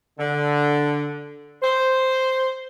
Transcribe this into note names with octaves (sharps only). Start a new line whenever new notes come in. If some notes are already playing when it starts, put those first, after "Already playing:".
D3
C5